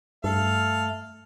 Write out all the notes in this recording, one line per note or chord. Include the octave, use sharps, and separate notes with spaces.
G2 A3 A4 F5